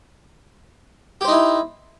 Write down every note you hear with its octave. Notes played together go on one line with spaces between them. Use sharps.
D#4 E4 G4 C5